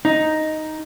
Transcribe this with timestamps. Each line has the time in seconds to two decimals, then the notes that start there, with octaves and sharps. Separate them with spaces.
0.05 D#4